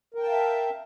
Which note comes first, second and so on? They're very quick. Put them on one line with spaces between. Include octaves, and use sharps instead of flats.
A#4 G5 A5 F5 E5